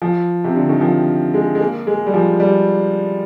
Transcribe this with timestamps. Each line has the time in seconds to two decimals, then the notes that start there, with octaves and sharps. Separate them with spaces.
0.02 F3
0.44 C3
0.56 D3
0.69 D#3
0.81 F3
1.34 G#3
1.55 G#3
1.60 A#3
1.87 G#3
2.07 G3
2.14 F3
2.40 G3